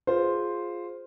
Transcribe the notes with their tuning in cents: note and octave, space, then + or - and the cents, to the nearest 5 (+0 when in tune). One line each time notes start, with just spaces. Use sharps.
F4 +5 G#4 +0 C5 +0